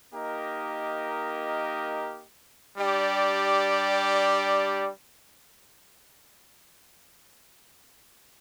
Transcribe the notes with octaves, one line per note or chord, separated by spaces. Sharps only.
A#3 D#4 G4 A#4 D#5
G3 D4 G4 D5